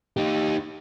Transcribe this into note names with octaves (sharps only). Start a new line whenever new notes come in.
D#4 G4